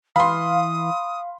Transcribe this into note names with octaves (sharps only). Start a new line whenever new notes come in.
E3 F5 B5 C6 D#6